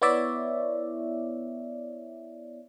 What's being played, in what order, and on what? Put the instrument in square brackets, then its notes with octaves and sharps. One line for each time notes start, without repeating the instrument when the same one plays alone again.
[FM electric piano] B3 E4 C#5 D5 E5